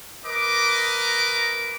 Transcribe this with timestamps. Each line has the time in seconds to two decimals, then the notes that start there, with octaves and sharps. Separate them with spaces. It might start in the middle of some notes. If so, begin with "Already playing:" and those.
0.24 A#4 B4 D#5 D6